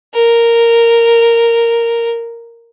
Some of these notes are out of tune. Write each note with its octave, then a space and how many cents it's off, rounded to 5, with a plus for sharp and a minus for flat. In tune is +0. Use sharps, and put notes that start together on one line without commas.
A#4 -5